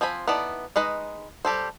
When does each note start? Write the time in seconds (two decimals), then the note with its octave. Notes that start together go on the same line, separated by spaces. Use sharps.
0.01 F3 C4 G#5 B5
0.28 B3 D#4 E4 A4 D5
0.76 G#3 D#4 B4 D#5
1.45 G3 G4 A4 C5